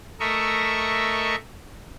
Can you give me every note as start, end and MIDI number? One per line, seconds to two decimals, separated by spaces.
0.20 1.35 57
0.20 1.35 70
0.20 1.35 75
0.20 1.35 76
0.20 1.35 85